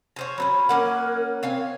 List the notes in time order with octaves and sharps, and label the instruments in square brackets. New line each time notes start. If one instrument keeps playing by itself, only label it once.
[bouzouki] C#4 C5 C#5
[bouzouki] F#3 C4 C#4 [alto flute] B5
[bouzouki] A#3 C#4 F#5 [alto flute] A#4
[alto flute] C4 [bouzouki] C#5 F5 G#5